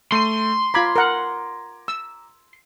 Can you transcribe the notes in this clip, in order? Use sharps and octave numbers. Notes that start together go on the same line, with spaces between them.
A3 C6 D#7
F4 A#5 B5 D6 G#6
A#4 F#5
E6